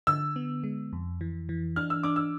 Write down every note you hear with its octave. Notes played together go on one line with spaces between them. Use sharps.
D3 E6
B3
G#3
F2
E3
E3
D4 F6
E6
D4 D6
E6